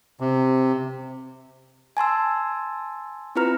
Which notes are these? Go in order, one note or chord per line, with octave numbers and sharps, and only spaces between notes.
C3
G#5 A5 C6 E6
C4 E4 F4 B4 A#5 F6